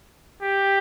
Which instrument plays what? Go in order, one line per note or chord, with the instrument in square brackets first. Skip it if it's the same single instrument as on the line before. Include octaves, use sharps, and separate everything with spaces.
[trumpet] G4